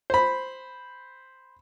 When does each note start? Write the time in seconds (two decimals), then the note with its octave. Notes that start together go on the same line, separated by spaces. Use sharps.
0.10 C5 B5